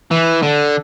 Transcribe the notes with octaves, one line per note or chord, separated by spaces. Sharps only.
E3
D3